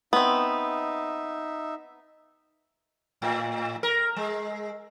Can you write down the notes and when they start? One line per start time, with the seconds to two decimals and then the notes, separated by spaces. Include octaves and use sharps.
0.13 B3 C4 D#4 E5
3.22 A2
3.83 A#4
4.16 G#3